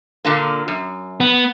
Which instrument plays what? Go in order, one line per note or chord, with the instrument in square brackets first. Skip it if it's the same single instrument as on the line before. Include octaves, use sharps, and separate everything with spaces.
[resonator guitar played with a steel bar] A#2 D3 A#3
F#2
[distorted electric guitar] B3